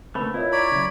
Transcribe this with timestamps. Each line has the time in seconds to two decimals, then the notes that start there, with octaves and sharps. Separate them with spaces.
0.15 C#3 A3 A#3 C4 D4 B4 B5
0.34 E4 F4 A#4 C#5 D#5 E5
0.52 C#5 D5 A#5 B5
0.72 C#3 F#3